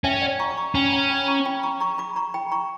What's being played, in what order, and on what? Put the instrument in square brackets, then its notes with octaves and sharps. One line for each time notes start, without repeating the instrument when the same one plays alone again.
[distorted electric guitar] C#4 [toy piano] E5 G5
[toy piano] D5 F#5
A#5 C#6
D6
A#5 C#6
[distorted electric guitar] C#4 [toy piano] G5 B5
[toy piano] F#5 A#5
G5 B5
A#5 C#6
G5 B5
A#5 C#6
A#5 C#6
B5 D6
A#5 C#6
G5 B5
A#5 C#6